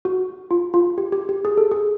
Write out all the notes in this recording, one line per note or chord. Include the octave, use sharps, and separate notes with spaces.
F#4
F4
F4
G4
G4
G4
G#4
A4
G#4